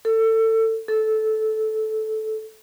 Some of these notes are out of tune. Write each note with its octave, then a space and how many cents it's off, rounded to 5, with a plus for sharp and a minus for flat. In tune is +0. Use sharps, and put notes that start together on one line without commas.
A4 +25
A4 -15